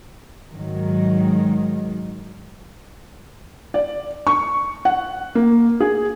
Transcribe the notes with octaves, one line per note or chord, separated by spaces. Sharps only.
G#2 D#3 F#3 G#3
D5
C#6
F#5
A#3
G#4